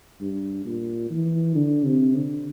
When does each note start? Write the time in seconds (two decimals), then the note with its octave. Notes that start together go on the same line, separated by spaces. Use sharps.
0.21 G2
0.65 A#2
1.10 E3
1.55 D3
1.85 C3
2.15 D3